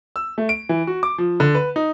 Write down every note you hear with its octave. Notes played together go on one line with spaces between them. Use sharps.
E6
A3
D7
E3
F#4
D6
F3
D3
B4
D#4